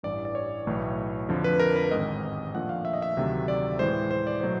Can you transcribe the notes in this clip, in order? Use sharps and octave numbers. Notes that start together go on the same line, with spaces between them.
A1 G2 E3 D5
D5
C#5
B1 A2 E3 A3
F2 D3 F3
B4
A#4
B4
A1 G#2 D#3 G#3 C4 D#5
A#2 F3 A3 D4 F#5
F5
E5
D#5
E5
D2 C3 D#3 F#3 A3
D5
A2 E3 G#3 C5
C5
D5
B2 F#3 A3 C5